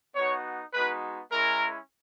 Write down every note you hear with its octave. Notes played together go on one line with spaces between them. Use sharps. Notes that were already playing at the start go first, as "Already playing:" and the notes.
B3 D#4 F#4 C#5
G#3 B3 D#4 F#4 B4
G#3 C#4 E4 A#4